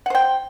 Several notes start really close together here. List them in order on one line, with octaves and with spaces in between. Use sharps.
F#5 C5 G5